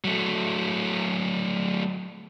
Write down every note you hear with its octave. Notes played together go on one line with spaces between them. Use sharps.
F#3 A3